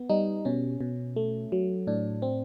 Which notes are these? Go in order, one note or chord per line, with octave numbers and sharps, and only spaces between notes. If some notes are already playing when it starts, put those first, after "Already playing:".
Already playing: B3
G3 D#4
B2 C#4
B2
A3
F#3
A2 D4
C4